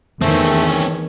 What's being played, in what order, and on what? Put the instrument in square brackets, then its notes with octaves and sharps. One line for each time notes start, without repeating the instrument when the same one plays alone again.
[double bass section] E2 D#3 [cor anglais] A3 [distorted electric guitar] C4 C#4